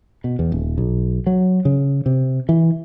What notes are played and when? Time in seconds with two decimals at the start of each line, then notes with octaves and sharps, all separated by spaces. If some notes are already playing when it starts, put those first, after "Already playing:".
0.24 B2
0.39 E2
0.52 D#1
0.78 B1
1.26 F#3
1.65 C#3
2.06 C3
2.49 E3